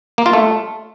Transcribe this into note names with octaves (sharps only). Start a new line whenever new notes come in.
A#3
F4
A3